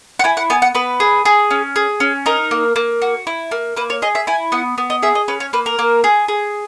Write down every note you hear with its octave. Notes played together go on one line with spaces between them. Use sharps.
F#5
E4 G#5
F#5
B3 G#5
F#5
B3 B4
G#4
G#4
C#4
G#4
C#4
D#4 A#4
A#3
A#3
F#4
E4
A#3
A#3 B4
C#5
G#4 D#5
E5
E4 G#5
B3 F#5
B3
D#5
G#4 E5
D#5
C#4 B4
C#5
A#3 B4
A#4
A#3
G#4
G#4